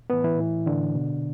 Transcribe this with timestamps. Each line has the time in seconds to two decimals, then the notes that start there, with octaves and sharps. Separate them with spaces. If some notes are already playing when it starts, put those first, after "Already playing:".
0.10 A2 E3 B3 B4
0.24 E3 E4
0.38 A2 E3
0.66 A2 D3 E3 D4
0.95 B2